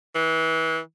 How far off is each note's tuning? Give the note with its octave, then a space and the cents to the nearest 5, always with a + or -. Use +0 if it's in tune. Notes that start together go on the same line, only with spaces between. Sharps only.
E3 -25